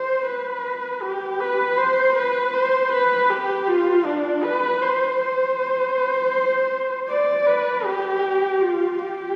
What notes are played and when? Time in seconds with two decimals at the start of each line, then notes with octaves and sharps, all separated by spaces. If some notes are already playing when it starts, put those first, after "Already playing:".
Already playing: C5
0.26 B4
1.02 G4
1.40 B4
1.78 C5
2.16 B4
2.53 C5
2.92 B4
3.30 G4
3.68 F4
4.05 D4
4.43 B4
4.82 C5
5.19 C5
7.09 D5
7.47 B4
7.85 G4
8.61 F4
8.99 G4